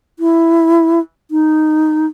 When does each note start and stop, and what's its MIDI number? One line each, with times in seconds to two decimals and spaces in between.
0.19 1.00 64
1.31 2.06 63